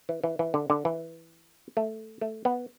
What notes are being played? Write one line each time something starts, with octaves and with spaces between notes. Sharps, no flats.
E3
E3
E3
D3
D3
E3
A3
A3
B3